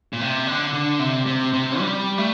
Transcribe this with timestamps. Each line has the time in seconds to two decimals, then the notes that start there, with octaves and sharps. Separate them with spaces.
0.13 A#2
0.21 C3
0.47 D3
0.73 D3
0.99 C3
1.26 C3
1.53 C3
1.79 G3
2.18 A3